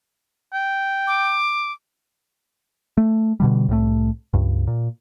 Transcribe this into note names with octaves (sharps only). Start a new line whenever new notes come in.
G5
D6
A3
B2 D3 G3
C2 A2 G3 A3
C#2 G2
A#2